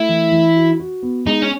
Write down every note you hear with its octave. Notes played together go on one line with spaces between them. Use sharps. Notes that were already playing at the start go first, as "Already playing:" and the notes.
Already playing: A3 E4
E3
E3
F#4
F#4
B3
G#3 D#4
C#4